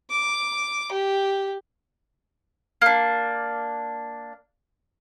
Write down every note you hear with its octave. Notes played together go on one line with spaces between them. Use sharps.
D6
G4
A#3 D4